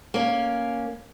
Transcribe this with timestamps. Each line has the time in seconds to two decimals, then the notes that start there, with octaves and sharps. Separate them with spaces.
0.14 A#3 C#4